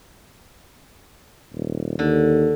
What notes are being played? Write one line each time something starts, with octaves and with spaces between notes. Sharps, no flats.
D#1
D#2 D3